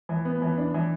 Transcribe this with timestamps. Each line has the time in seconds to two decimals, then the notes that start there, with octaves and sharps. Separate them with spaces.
0.09 E3
0.25 B3
0.42 E3
0.58 D4
0.74 E3